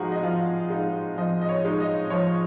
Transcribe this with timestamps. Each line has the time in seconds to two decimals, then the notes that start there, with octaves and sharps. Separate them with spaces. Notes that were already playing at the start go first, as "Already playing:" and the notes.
Already playing: F3 G#3 D#4 F#4 G#4 F#5 G#5 A#5
0.12 D#5
0.23 F3 F4 F5
0.70 G#3 D#4 D#5
1.17 F3 D#5
1.41 D#5
1.49 C#5
1.65 G#3 D#4
1.80 D#5
2.10 F3 C#5